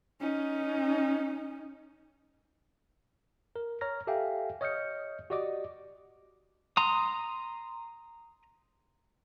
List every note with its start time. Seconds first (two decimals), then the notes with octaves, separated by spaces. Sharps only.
0.20 C#4 D#4
3.56 A#4
3.81 C#5 A#5 F6 A#6
4.07 G4 A4 E5 F5 G5 G#5
4.61 C#5 D#5 D#6 F6 G6 C#7
5.30 F#4 G4 D5 D#5 D6
6.77 A#5 C6 D#6